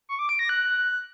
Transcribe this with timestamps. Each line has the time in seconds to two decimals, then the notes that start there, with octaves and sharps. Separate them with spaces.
0.09 C#6
0.19 D6
0.29 D7
0.39 A#6
0.49 F#6